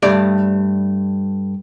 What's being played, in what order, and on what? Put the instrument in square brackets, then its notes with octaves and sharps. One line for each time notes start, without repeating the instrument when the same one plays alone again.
[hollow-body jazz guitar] G2 A3 D5